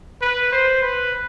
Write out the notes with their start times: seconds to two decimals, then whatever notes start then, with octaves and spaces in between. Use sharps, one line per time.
0.22 B4
0.52 C5
0.82 B4